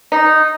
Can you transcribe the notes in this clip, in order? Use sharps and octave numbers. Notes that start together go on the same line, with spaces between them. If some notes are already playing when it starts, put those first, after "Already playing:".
D#4